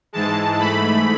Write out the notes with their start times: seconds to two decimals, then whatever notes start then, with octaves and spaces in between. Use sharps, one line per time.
0.13 G#2 E3 G#3 A5
0.59 G#2 E3 A3 B5